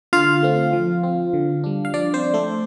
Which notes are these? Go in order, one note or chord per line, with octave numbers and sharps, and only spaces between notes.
D3 F4 F5
A3 C4
F3
C4
D3
G3 D4
F5
F3 D4 D5
C4 C5
D4
A3 A4